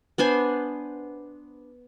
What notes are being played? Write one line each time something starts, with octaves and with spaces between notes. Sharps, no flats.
B3 D4 C5 G#5